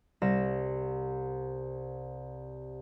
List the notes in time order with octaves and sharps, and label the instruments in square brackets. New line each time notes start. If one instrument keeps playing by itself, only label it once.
[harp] C2 A#6 E7